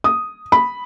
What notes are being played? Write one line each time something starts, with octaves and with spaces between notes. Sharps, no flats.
D#6
B5